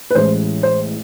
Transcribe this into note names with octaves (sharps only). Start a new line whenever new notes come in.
B4
A1 A2 G#3 C5
C5